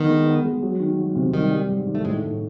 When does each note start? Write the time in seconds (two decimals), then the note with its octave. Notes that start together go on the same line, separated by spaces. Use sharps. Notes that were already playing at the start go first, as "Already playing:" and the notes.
Already playing: D#3 B3 D4
0.09 G#3
0.25 B3
0.44 G#3
0.62 F#3
0.80 D#3
0.98 F#3
1.15 C3
1.33 D#3 G3
1.50 G3
1.69 G#2
1.87 D#3
1.95 A3
2.05 A2 G#3
2.22 A2